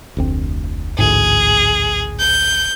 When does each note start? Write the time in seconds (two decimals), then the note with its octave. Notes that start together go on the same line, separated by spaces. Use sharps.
0.17 F1 D2 C4
0.99 A1 D2 G#2 G#4
2.20 G6